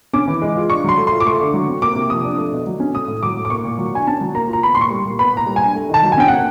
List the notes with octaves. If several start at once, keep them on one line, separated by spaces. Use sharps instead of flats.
C#4 D6
E3
G#3
F4
D4 C#6
F#3 C6
A3
F4 C6
D6
A3 C#6
D3
F#3
C4
A#3 D6
C3
F3 D#6
D4
A3
B2
F#3
C#4
A3 D#6
A2
F#3 D6
A2
D6
A#3 C#6
A#2
F#3
D4 G#5
C#4 A5
F#3
A#3 A#5
F4
A#5
B3 B5
A#2 C6
C#6
G3
A#2
B3 B5
A#2 A#5
G3
D4 G#5
A3
D#3 A5
F#3
G#5
C#4 G5
A#3 F#5